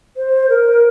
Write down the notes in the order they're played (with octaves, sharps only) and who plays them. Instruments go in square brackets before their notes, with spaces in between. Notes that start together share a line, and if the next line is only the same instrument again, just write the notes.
[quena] C5
A#4